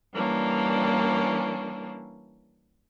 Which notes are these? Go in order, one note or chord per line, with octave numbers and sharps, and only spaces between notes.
E3 G3 A#3 C#4 D4